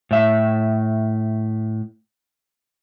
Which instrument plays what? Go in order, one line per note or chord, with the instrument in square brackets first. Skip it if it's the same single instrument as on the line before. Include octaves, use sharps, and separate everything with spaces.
[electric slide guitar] A2 E5